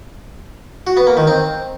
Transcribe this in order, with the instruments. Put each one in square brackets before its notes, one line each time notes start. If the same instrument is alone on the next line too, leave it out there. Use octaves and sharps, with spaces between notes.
[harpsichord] F#4
B3
A#3
D#3
C4